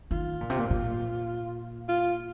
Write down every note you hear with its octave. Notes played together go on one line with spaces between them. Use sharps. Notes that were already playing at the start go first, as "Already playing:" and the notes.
D#3 F4
A#2
C3
A#2
A#2
F4